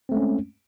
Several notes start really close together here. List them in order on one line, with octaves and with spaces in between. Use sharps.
C4 A3 G#3 C#4